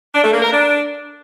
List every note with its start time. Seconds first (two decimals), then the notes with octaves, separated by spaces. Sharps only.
0.13 D4
0.23 A3
0.32 A#3
0.42 A#4
0.51 D4